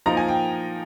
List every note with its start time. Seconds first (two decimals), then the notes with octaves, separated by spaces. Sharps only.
0.06 F3 A#3 D#4 A#5
0.17 G#5
0.28 G5